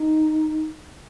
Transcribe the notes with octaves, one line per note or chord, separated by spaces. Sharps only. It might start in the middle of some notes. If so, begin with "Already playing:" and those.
Already playing: D#4